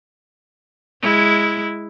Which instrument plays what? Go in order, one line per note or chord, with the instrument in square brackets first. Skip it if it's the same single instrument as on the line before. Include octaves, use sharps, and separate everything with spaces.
[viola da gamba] G#3 E4